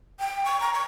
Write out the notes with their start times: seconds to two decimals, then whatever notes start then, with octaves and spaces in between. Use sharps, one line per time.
0.20 G5
0.45 C#6
0.61 A#5
0.73 C#6